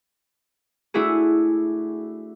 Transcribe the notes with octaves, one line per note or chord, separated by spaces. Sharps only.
A3 D4 E4 F#4 G#4